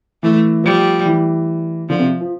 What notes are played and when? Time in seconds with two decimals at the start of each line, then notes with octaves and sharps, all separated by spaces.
0.23 E3 A3
0.64 F3 G3
1.06 E3
1.89 D3 F3
1.99 C3
2.21 F3